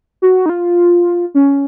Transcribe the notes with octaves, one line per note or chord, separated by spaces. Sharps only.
F#4
D#4
F4
C#4